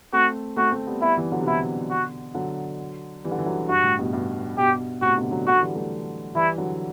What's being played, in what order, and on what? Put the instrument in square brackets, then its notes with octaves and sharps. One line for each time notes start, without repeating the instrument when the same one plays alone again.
[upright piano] A3 C4 [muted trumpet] F#4
[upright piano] A3 C4 [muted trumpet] F#4
[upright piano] A3 C4
G3 B3
[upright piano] G3 B3 [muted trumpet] E4
[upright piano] E3 G3
D3 F#3
C3
[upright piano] B2 D3 [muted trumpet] E4
[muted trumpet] F#4
[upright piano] D3 F#3
E3 G3
D3
E3
D3 F#3
[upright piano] G2 [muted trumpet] F#4
[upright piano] A2
G2 B2
G2 B2
[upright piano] G2 B2 [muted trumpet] G4
[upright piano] A2 C3 [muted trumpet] F#4
[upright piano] B2 D3
D3 F#3
[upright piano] D3 F#3 [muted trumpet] F#4
[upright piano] E3 G3
F#3 A3
[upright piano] E3 G3 [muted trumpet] E4
[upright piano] D3 F#3